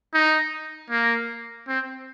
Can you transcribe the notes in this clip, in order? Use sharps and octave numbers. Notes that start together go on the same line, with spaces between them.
D#4
A#3
C4